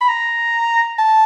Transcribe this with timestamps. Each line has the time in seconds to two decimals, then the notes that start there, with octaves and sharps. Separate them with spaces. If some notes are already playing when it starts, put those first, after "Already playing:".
0.01 B5
0.08 A#5
0.98 A5